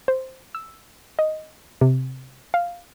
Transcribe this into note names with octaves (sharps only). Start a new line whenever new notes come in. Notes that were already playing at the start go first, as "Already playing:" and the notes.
C5
E6
D#5
C3
F5